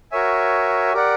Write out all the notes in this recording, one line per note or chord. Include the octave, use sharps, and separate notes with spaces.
F#4 A#4 C#5 E5 G#5
G4 A#4 D5 F#5